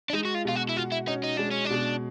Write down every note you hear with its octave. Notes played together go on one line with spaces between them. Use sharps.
D4
G#3 D#4
F#4
F4
B2 F4
F#4
E4
F4 F#4
E4
C#4 D#4
D#4
G#3 D4
C#4
D4
B2